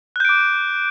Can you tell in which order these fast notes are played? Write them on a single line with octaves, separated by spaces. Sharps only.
F#6 G6 D7 D6